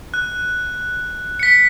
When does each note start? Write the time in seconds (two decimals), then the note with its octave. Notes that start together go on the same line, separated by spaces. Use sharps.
0.14 F#6
1.39 B6 C#7